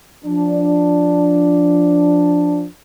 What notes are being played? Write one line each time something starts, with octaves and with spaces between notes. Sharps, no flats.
F3 D4